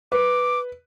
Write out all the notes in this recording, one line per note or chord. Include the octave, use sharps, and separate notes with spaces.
B4 D6